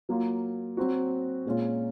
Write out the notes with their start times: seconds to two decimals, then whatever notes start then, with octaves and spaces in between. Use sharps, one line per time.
0.09 F#3 A#3 F4
0.77 F#3 C4 F#4
1.45 A#2 G#3 C#4 F4